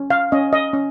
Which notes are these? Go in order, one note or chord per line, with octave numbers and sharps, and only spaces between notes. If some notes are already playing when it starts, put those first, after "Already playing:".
Already playing: C#4
F5
C#4 D#5
D#5
C#4